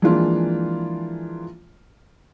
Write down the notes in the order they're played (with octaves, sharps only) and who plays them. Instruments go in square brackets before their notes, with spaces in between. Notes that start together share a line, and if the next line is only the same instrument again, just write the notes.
[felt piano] E3 F3 G#3 A#3 D4 F4